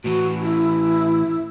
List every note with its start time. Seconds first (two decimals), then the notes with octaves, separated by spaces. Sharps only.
0.04 A2 E3 F#4
0.43 E4